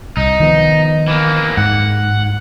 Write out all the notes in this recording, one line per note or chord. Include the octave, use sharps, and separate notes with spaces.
C2 D#4
D#3 F3 B3
E3 A#3
G#2 F#5